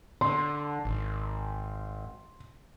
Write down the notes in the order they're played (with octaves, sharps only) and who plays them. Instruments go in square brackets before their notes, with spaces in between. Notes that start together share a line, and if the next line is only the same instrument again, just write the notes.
[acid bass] D3 [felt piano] C6
[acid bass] G#1